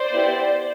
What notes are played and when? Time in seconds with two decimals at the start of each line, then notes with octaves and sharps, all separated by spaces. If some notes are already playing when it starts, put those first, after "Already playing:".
Already playing: C5 D5
0.11 B3 E4 G4